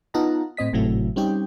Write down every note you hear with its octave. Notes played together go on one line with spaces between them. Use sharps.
B3 D#4 F4 F#5 A5 A#5
A2 C4 D#5 B6
G#1 A2 C3 F#3 A3 E4
G3 C4 C#4 D#4 G4 G5